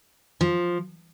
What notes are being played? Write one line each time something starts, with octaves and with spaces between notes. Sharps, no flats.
F3